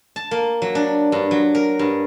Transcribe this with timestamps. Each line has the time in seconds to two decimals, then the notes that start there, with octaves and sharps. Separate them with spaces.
0.16 A5
0.31 A#3
0.62 F#3
0.75 D4
1.12 G2
1.31 F#3
1.55 A#4
1.79 G2